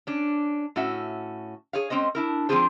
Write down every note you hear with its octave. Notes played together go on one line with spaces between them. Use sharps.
C#4 D4
A2 C#4 F#4 E5
G#4 C#5 F5
G#3 C4 C#4 C5 D#5
D4 E4 A#4
F3 C4 D4 F4 G#4 C5